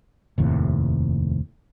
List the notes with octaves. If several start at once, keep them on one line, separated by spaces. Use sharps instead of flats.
F1 D#2 A2 C3